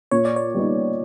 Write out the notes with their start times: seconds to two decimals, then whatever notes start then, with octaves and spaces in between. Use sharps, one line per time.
0.11 A#2 C#5
0.25 D5
0.36 C#5
0.55 G3 B3 D#4